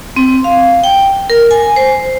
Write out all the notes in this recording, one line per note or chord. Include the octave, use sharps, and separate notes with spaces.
C4
F5
G5
A#4
G#5
C5